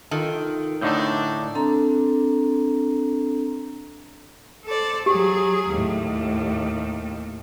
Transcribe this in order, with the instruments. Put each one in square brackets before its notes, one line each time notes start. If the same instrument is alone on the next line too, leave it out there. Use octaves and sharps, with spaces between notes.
[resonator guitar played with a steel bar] D#3 [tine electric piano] D#4 F4 A4
[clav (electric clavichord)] A2 D3 D#4 [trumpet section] D4 [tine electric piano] C#6 E6 G6
[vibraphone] C4 D4 A4 A#5
[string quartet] A4 C5 D5
[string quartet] F#3 G#4 [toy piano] G4
[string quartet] D#2 A2